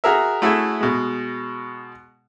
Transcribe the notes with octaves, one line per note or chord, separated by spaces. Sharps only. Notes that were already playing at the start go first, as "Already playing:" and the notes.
F#4 G#4 A#4 E5
A3 C#4 E4 F#4 G#4 A4
B2 G#3